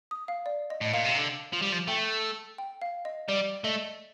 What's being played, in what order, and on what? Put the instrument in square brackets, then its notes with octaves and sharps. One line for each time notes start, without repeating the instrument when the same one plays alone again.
[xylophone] D#6
F5
D5
D#5
[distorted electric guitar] A2 [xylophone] D#5
[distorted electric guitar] A#2 [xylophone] F5
[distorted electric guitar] C3
D3
F3
G3
F3
[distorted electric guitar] A3 [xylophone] G5
[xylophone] G5
F5
D#5
[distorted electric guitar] G3 [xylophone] D5
[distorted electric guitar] A3 [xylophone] D#5